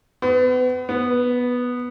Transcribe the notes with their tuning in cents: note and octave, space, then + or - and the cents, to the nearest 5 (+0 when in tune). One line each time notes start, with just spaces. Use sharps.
B3 +35
B3 -5